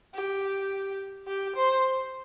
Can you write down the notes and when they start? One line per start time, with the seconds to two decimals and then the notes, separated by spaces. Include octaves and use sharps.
0.15 G4
1.27 G4
1.56 C5